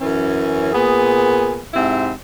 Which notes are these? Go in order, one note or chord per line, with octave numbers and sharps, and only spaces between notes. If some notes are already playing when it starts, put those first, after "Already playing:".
F#2 E3 C#4
A#2 B3 G#4
G#2 C3 C4 E4